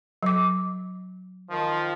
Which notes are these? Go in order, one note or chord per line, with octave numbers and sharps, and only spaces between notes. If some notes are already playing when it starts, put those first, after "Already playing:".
F#3 D6
D#3 F3